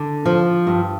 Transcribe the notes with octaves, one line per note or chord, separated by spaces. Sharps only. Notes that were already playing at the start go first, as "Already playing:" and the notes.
Already playing: D3
F3
G2